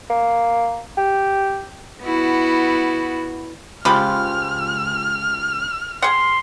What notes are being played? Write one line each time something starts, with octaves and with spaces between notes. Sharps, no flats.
A#3
G4
B3 E4 F#4
C#2 F3 F4 G4 B5 F6
G#4 F#5 C6